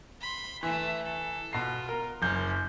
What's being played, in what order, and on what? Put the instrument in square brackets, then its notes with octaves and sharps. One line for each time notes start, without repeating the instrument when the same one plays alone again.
[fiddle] B5 C6
[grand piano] E3 [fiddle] A3 E5
[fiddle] A4
[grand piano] B2 C7 [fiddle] F4
[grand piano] A#4
[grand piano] F#1 G6 [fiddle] C#4